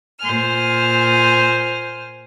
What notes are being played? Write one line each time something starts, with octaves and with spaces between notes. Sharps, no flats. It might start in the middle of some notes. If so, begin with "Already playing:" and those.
A#2 C5 G#5 F6